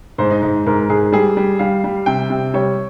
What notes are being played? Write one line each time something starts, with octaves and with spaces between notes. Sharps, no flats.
G#2 C5
D#4
G#2 D#4
G#2 A#4
G#2 G#4
G3 G#4
G3
G3 F5
G3
C3 G5
C3
G3 C#5